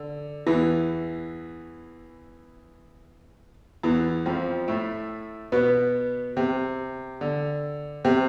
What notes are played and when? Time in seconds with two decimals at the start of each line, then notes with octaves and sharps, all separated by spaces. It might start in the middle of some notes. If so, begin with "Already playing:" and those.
Already playing: D3
0.47 E2 E3
3.83 E2 E3
4.26 F2 F3
4.68 A2 A3
5.52 B2 B3
6.37 C3
7.21 D3
8.05 C3